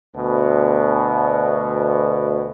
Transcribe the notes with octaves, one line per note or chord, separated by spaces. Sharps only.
D2 B2